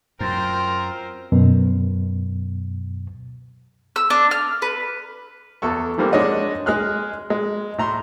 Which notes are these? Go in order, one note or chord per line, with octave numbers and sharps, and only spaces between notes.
F#2 C4 F4 A#4 C5 G5 C6
F#2 B2
E6
D4
F6
B4
E2 A4 C#6
E3 F3 G3 A#3 C4 D4
G#3 D4 C#5 D#5 F#5
G#3 G#4 F6 F#6
G#3
A2 A#5 C6